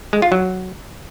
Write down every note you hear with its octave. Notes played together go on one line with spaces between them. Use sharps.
G#3
F4
F#3